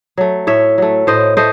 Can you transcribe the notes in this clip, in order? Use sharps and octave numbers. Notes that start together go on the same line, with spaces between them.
F#3 A3
A2 C#5 E5
F#3 A3
A2 C5 D#5
A3 C5 D#5